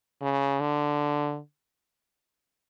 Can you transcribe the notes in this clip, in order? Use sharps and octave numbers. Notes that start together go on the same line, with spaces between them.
C#3
D3